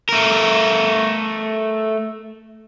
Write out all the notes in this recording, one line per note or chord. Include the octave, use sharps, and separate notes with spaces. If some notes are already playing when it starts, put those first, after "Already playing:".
A3 A#4